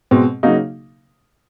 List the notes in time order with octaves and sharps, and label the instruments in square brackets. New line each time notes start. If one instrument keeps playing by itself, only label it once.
[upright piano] B2 G#3 C4
C#3 F#3 A#3 D#4 F#4